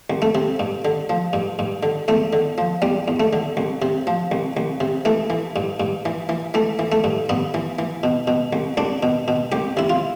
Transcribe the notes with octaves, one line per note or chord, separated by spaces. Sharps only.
C2
A3
C3
G2
D3
F3
G2
G2
D3
E2 A3
D3
F3
E2 G3
E2
A3
D3
C2
C3
F3
C2
C2
C3
E3 A3
E3
G2
G2
E3
E3
E3 A3
E3
A3
G2
G2 B3
E3
E3
B2
B2
C2
C2 D4
B2
B2
C2 G4
C3 E4
F4